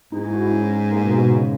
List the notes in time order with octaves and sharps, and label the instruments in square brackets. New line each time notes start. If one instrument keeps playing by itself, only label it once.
[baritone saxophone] G#2 [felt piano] D#4
[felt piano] E4
F#4
E4
C#4
A#3
B2
B2
C#3